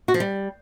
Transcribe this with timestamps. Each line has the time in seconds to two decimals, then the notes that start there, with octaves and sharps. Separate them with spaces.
0.08 F#4
0.14 F3
0.20 G3